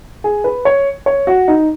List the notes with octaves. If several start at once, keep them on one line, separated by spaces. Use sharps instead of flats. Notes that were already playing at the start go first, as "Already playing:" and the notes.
G#4
B4
C#5
C#5
F#4
D#4